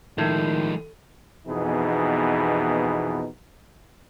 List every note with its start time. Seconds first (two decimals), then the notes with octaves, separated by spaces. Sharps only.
0.18 A2 D#3 F3 G#3
1.48 F2 B2 E3 B3 D#4 G#4